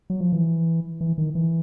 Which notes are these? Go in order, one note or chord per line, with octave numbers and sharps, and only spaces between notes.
F#3
F3
E3
E3
D#3
E3